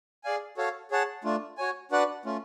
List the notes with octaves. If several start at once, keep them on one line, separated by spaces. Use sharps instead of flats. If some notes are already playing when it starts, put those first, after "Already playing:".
G#4 D5 F5 G#5
F#4 A4 C#5 F5
G#4 C#5 F#5 A5
A3 D4 F4
F#4 C#5 G#5
D4 F#4 B4 D5 F#5
A3 C#4 F4